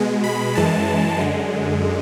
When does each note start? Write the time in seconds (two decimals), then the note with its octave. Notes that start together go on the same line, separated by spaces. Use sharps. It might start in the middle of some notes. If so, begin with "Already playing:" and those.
Already playing: B2 G#3
0.24 B5
0.55 F#2 E3 G#3 A5
1.20 F#2 D3 G#3